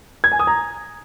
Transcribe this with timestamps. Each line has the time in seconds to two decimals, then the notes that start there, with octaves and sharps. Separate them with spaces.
0.24 G#6
0.32 G#5
0.39 D#6
0.47 A#5